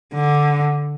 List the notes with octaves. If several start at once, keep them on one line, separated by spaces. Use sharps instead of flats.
D3